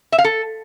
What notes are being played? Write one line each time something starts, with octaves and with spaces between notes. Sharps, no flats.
E5
F5
A4